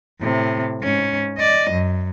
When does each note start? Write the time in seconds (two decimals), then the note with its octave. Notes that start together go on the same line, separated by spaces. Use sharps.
0.21 A2 C3
0.82 G#2 C#4
1.37 D5 D#5
1.71 F#2